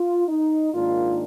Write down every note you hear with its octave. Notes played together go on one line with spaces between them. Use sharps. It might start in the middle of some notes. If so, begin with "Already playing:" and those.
Already playing: F4
D#4
G#2 D#3 A#3 D4 F4